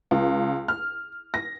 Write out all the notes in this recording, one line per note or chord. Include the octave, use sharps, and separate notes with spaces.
C#2
F6
A#6